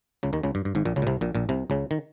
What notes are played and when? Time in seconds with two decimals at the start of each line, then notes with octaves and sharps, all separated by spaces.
0.23 C#2 C#3
0.33 D#2 D#3
0.43 C#2 C#3
0.55 G2
0.65 G2
0.75 G#1 G#2
0.85 A#1 A#2
0.96 C#2 C#3
1.02 A#2
1.07 C2 C3
1.21 A#1 A#2
1.35 A#1 A#2
1.49 C2 C3
1.70 C#2 C#3
1.91 D#3